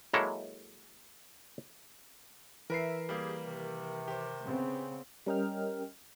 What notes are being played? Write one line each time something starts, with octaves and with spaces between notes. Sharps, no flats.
F#3 G#3 A#3 E4 A4 C#5
E3 A#4 B4 E5 C7
G3 A#3 G4 G#4
C3 D#3
G4 C5
C#3 B3 C4
G3 C#4 A#4 D#5 G5 F6